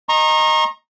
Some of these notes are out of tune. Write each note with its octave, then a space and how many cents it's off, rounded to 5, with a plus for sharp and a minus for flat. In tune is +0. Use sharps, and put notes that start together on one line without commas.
D#5 +0 A#5 +0 C#6 -40